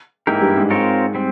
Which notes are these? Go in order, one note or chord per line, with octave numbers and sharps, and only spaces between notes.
G#2 E3 G#3 A#3 E4 G4 A#4
G2 G3
G#2 G#3
C4 F4 A#4 C#5
G3 C4